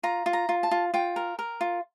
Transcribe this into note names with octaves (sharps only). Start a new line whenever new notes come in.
F4 A#5
F4
A#5
F4
A5
F4
F4 G5
A#4
A#4
F4